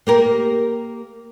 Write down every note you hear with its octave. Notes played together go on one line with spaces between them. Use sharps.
A#3 G4 A#4